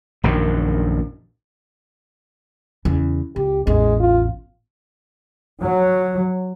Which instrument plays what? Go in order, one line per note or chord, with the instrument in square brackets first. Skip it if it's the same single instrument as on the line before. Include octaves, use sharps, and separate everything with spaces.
[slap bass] A#1 F#2 D#3
[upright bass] E2 C#3
[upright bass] C#2 [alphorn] G4
[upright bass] A1 E2 [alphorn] G#3
[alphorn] F4
[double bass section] F#3